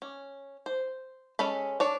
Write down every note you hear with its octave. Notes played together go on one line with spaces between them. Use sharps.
C#4
C5
G#3 C#4 A4 B5
D4 C#5